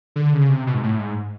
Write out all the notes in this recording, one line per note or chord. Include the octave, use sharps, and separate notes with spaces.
D3
C#3
C3
B2
G#2
A2
G#2